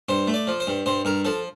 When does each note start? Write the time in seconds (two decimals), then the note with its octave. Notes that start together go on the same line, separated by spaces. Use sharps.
0.09 G2 C5
0.28 A3
0.34 D5
0.47 F3
0.60 C5
0.67 G2
0.86 G2 C5
1.05 G2 A#4
1.25 F3 A4